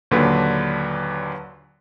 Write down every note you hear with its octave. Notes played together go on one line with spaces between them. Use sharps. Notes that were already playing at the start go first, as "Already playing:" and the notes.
D#2 A#2 D3 F#3 D4 B4